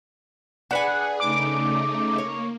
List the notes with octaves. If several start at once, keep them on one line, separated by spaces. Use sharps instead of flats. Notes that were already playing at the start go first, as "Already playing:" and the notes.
D4 G#4 B4 F#5 G#5
C#3 A3 D#4 D6
A#3 C#5